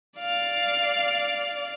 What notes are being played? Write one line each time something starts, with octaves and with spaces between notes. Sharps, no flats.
D5 F5